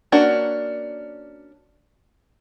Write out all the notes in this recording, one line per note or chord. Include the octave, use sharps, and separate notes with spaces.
A#3 C#4 D4 F#4